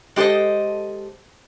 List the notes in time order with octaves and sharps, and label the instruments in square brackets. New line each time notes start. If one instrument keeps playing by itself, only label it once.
[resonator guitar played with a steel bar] G#3 G4 A4 C5 D#5